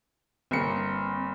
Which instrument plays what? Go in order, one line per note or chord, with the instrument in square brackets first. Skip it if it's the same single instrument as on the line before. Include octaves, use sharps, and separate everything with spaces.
[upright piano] G1 A#3 C#7 [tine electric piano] C4